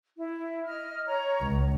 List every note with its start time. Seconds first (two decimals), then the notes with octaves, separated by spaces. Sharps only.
0.17 E4
0.65 D#5 F6
1.06 C#5 A#5
1.41 C#2